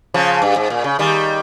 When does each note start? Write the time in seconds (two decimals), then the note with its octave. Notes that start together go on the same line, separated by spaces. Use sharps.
0.14 C#3 F3
0.42 G2
0.56 G#2
0.70 A#2
0.84 C#3
0.99 D#3 G3